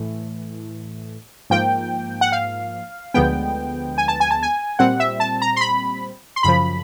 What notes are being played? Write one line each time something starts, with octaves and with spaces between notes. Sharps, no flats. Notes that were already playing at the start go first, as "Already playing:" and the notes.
Already playing: A2 E3 A3
G#2 F3 A#3 G5
F#5
F5
D2 D3 F3 G#3 B3 G5
G#5
A5
G#5
A5
G#5
A#2 G3 C4 F#5
E5
A5
A#5
C6
B5
C6
F#2 C#3 F3 B5